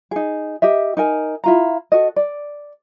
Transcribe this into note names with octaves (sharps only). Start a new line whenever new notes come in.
D#4 G#4
G4 D#5 E5
D#4 A#4 G#5
E4 F4 A#5
F#4 A4 D#5
D5